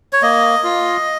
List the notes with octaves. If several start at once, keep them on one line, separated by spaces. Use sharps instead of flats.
C#5
A#3 D#5
F4